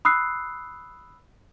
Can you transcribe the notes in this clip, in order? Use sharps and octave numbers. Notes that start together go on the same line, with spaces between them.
B5 D#6 E6 F#6 C7